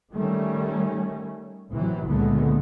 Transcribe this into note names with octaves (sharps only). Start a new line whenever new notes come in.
D#3 G3 A3 C#4
A1 C3 E3 F#3
C#2 A#2 D3 G#3 A3 B3